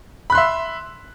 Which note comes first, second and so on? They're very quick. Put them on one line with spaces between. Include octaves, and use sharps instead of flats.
B5 F#6 C6 E5